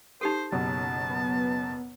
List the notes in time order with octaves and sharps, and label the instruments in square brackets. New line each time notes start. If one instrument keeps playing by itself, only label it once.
[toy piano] D#4 G4 A4 [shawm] C5
[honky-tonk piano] F#1 F#2 B2 [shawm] A5
[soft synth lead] B3